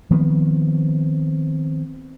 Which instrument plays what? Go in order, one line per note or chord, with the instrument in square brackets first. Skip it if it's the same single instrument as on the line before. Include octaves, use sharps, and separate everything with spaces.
[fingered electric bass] D#3 F3 B3 C4